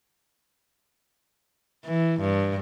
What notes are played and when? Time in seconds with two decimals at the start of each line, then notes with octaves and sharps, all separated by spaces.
1.85 E3
2.20 G2